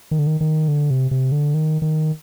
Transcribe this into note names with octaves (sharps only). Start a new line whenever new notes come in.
D#3
D3
D#3
D#3
D3
C3
C3
D3
D#3
D#3